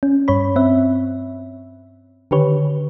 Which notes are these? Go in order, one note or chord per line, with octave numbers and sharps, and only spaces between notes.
C#4
G2 C#5 B5
C4 E5
D3 D#3 G4 B4 C#5